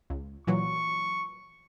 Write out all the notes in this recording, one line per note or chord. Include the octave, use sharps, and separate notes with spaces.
C#2
A#2 E3 F#3 C#6